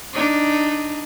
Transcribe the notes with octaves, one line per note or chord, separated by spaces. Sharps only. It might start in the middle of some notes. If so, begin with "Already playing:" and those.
D4 D#4